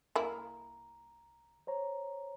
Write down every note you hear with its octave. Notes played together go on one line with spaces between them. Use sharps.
C2 A#3 E4 A#5
C5 C#5 A#5